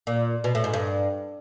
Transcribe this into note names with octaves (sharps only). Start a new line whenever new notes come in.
A#2
B2
A2
G#2
G2